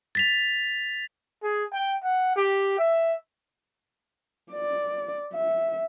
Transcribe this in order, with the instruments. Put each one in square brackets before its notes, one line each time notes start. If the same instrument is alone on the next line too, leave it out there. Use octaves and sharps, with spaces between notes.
[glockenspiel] A6 B6 F7
[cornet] G#4
G5
F#5
G4
E5
[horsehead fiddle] D5
E5